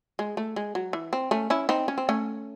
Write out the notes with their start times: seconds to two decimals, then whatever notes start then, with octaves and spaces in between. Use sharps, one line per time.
0.19 G#3
0.37 A3
0.56 G#3
0.75 F#3
0.93 E3
1.13 C4
1.31 A3 C#4
1.50 C#4 E4
1.69 C4 D#4
1.88 C#4
1.98 C4
2.09 A3 C#4